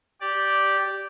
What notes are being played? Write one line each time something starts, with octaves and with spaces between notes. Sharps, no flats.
G4 D5